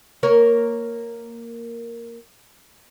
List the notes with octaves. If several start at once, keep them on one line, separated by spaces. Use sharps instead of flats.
A#3 A#4 C#5